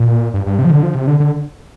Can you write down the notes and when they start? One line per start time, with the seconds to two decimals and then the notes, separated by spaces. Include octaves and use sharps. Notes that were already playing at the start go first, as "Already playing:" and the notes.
Already playing: A#2
0.34 G2
0.46 G2
0.59 C3
0.65 F3
0.71 D3
0.83 F3
0.95 C3
1.07 D3
1.20 D3